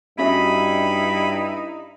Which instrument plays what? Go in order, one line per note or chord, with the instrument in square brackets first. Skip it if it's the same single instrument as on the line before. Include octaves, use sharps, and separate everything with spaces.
[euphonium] G2 [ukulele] C#4 F#4 E5 [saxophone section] D#4 E4 [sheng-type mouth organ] B5